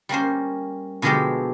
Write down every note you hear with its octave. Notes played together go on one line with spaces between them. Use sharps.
G3 A#3 C#4 C5
B2 D3 F3 G#3 G4 A4